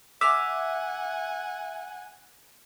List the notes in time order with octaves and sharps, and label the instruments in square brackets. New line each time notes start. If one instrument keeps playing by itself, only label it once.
[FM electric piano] E5 [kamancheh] F#5 G#5 [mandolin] D6 F6